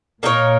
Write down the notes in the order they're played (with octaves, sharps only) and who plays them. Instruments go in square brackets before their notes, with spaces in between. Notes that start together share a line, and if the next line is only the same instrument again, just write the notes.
[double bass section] A#2 [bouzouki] A#3 D#4 A#4 C#5